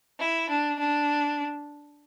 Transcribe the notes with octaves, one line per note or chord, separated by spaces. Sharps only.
E4
D4
D4